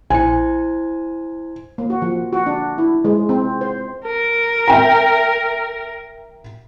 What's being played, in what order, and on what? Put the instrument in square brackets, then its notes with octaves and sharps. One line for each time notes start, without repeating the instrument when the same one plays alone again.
[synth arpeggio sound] A#1 C#7 [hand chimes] E4 C5 [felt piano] G#5
[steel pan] A#3
F#4
F3
F#4
D4
E4
G#3
C4
C5
[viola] A#4
[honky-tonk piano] E5 G5 A#5